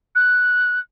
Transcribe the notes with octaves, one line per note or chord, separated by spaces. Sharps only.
F#6